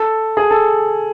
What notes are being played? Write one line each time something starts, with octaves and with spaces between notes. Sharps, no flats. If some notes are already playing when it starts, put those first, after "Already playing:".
Already playing: A4
G#4
A4